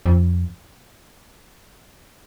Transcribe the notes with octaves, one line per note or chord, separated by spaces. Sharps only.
F2